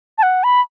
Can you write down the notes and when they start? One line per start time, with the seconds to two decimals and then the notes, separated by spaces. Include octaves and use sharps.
0.18 A5
0.23 F#5
0.44 B5